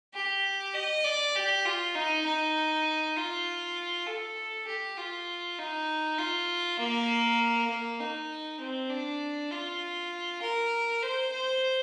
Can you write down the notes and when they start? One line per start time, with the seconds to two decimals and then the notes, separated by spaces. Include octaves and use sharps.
0.14 G4
0.74 D#5
1.04 D5
1.35 G4
1.65 F4
1.95 D#4
2.25 D#4
3.16 F4
4.07 A4
4.67 G4
4.97 F4
5.58 D#4
6.19 F4
6.79 A#3
7.70 A#3
8.00 D#4
8.60 C4
8.90 D4
9.51 F4
10.42 A#4
11.02 C5
11.32 C5